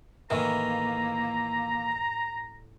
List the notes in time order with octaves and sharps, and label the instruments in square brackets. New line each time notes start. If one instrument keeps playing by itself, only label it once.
[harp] A2 C#6 [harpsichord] D#3 E3 [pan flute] A#3 [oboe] A#5